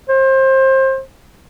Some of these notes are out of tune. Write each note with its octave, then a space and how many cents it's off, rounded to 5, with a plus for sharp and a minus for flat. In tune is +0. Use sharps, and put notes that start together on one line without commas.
C5 +25